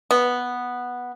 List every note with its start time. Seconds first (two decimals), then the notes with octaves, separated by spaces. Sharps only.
0.11 B3